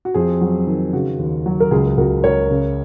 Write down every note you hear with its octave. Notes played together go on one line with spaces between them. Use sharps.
F#4
F2 G#4
F#3
D#3
C#3 F#4
D#2
F#3
A#4
C#2 G#4
C#2 F#4 A#4
C#2 A#4 C#5
C#3